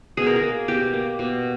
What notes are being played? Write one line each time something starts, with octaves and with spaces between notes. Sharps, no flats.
B2 G#4
A#4
G#4
A#3
B2 G4
A#3
B2